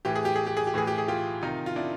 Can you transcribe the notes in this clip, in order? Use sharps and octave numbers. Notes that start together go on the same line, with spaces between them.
A2 E3 G4
G#4
G4
G#4
G4
G#4
G4
A2 E3 G#4
G4
G#4
F4 G4
C3 D#3 D#4 F4
F4
D4 E4